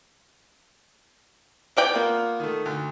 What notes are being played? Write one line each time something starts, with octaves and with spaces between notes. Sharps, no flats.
B3 D5 G5
A#3 F4 A#4
D#3 A3
D2